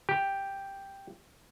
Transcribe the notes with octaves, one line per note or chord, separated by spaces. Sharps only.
G4